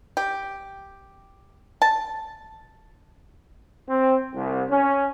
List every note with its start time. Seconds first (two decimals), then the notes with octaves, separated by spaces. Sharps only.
0.17 G4
1.82 A5
3.89 C4
4.33 C2
4.69 C#4